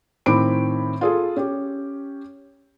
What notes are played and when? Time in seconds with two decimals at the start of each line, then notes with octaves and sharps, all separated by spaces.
0.26 A2 D#3 C4 B5 D6 D7
1.01 F4 G#4 A4
1.36 C#4 G4